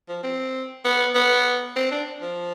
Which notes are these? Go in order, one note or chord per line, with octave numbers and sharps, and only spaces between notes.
F3
C4
B3
B3
C4
D4
F3